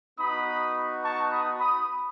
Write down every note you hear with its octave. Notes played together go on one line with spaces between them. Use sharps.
B3 D#4 F#4 B5 D#6
A5 C#6
B5 D#6
B5 D#6